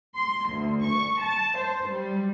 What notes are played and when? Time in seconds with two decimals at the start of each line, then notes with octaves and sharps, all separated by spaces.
0.16 C6
0.50 D2
0.86 C#6
1.23 A5
1.59 C5
1.90 G3